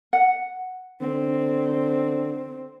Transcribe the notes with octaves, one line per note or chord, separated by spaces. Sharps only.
F#5
D3 C4